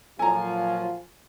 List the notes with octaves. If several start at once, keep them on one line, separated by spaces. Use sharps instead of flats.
A#2 F3 F#3 F4 A4 G#5 A#5